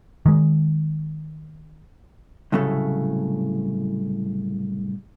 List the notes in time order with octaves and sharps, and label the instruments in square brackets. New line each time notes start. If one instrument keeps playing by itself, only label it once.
[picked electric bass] D#3 G#3
[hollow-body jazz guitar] C2 A2 C#3 F#3 A3